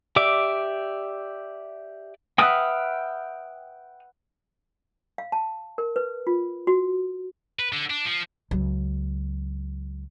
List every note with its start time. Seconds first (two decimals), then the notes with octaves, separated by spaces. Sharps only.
0.16 G4 D5 E5 D6
2.38 B4 E5 F#5 G5 D#6 F6
5.18 F5
5.32 A5
5.78 A#4
5.96 B4
6.27 F4
6.67 F#4
7.59 B4
7.73 D3
7.90 D4
8.05 F3
8.51 C#2 F#3